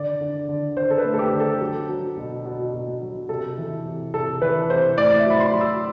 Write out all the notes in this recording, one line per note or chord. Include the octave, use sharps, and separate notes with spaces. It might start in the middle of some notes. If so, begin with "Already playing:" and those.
Already playing: D3 D5
D3
D3
D3 C5
A4
B4
A3
A4
G4
D3
A4
F#3
F#3
B2
B2
B2
F#3
C3 A4
E3
C3
C3 A4
E3 B4
C3 C5
A2 D5
E5
F#3 B5
C6
F#3
E6